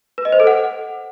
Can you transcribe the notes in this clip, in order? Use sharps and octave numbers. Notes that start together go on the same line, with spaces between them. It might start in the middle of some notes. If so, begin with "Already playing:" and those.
B4
D#5
C5
A4
F#5